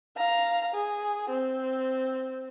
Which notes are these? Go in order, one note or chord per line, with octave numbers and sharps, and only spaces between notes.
F5 A#5
G#4
C4